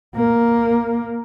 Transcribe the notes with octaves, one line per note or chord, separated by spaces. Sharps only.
A#3